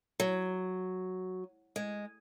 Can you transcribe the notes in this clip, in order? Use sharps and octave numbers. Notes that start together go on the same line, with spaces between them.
F#3
G#3